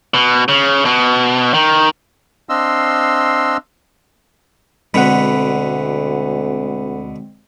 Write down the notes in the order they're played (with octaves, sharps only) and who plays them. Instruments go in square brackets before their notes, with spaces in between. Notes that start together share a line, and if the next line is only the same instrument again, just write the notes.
[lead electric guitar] B2
C#3
B2
D#3
[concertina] C4 D4 D#5 F5 C6 E6
[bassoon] D2 [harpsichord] B2 D3 [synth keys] G#3 C4 [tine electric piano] F#5 B5